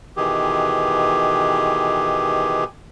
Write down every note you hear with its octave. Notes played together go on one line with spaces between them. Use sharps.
B2 D#3 E3 G4 G#4